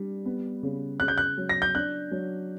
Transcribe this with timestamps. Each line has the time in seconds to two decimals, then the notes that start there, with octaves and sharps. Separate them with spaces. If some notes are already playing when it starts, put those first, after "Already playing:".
Already playing: G3 D4
0.25 B3
0.63 C#3
1.00 C#3 F#6
1.08 G6
1.18 F#6
1.38 F#3
1.49 A#6
1.62 G6
1.75 D4 F#6
2.11 F#3